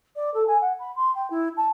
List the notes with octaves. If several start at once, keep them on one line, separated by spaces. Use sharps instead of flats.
D5
A4
G#5
F#5
B5
C6
G5
E4
A5